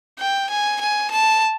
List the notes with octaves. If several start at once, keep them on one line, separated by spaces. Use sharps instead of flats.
G5
G#5
G#5
A5